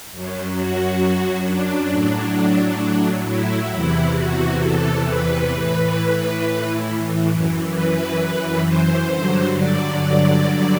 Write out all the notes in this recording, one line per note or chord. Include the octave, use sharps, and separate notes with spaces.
F#2 F#3
F#4
D4
A2 F#3
E4
E2 C3 E3 E4
F#4
A4
B4
A2 E3
F#2 E3
B4
C5
G2 D3 F#3
D5